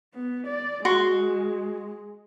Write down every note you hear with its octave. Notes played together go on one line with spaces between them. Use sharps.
B3
D5
G#3 F#4 C6